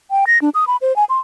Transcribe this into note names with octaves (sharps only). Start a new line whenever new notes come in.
G5
A#6
D4
D#6
B5
C5
G#5
C6